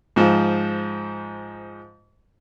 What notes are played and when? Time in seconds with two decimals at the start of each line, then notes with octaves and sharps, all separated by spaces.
0.16 G#2 F3